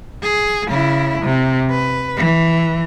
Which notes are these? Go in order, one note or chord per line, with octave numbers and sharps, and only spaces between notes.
G#4
C#3 E4
C3
B4
E3